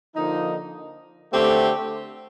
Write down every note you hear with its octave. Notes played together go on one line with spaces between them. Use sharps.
D3 F3 A#3 D#4
D3 A3 C4 G4